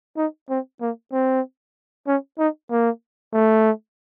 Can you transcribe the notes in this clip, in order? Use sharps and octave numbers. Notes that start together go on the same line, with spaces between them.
D#4
C4
A#3
C4
C#4
D#4
A#3
A3